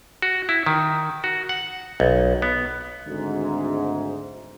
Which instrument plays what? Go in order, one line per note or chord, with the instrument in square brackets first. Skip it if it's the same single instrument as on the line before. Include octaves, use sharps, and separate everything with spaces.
[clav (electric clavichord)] F#4
E4
D#3
F#4
F#5
B1
B3
[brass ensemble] G#1 D2 G#2